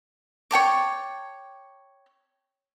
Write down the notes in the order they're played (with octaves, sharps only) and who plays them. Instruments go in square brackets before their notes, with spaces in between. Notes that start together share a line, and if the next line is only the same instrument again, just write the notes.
[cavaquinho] C#5 G5 A5 D6